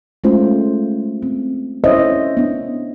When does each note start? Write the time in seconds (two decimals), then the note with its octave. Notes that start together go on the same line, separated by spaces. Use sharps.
0.24 G#3 A3 C#4 F4 C5
1.23 C4
1.84 C#4 E4 C5 C#5 D#5 E5
2.37 B3 D4